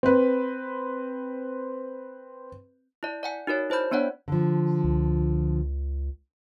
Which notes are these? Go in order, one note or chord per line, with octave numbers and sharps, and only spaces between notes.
C4 B4
E4 D5
D5 F#5 G#5
D#4 F#4 A#4 C#5
E4 C5 D5 B5 G6
B3 D4 C#5 D5 F#5
D3 F3
C#2